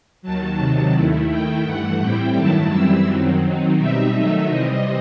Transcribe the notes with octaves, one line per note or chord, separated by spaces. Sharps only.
D#2 D#3 F#3 A5
C3 D#3 F#3 A5
D#2 D#3 A3 E4
D#3 A3 E4 G5
G2 E3 A3 F#5
A2 G3 C4 E4 G5
G2 D#3 F#3 A3 E4 A5
F#2 E3 G3 C4 E4 E6
F#2 D#3 F#3 C4
D#3 F#3 C4 D#4
B2 G3 C4 D#4 E5
D#3 F#3 A3 D#4 E5
C3 E3 G3 C4 D#5